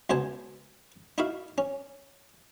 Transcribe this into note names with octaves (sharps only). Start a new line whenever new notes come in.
C#2 B2 B3 C5 G#5 A5
D#4 E4 F#4 E5 F5
C#4